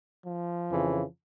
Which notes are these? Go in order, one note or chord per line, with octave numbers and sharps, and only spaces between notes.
F3
F2 C#3 E3